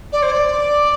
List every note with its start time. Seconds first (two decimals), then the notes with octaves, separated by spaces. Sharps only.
0.12 D5
0.22 C5
0.31 D5